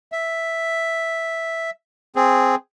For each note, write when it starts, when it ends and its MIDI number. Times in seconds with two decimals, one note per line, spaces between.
0.12 1.70 76
2.16 2.55 60
2.16 2.55 68